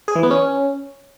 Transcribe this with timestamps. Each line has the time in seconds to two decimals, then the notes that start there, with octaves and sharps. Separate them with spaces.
0.08 G#4
0.15 E3
0.23 B3
0.31 C#4